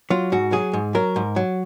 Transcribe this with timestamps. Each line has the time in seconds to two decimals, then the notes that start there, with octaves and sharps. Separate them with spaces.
0.10 F#3 F4
0.32 G#2 F#4
0.52 F#3 G#4
0.73 G#2
0.95 F#3 A#4
1.16 G#2
1.36 F#3